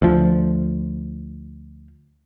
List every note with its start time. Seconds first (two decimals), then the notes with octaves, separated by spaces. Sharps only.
0.02 D2 F3